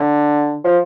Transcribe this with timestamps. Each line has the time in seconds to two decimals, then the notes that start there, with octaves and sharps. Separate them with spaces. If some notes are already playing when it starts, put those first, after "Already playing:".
Already playing: D3
0.64 F3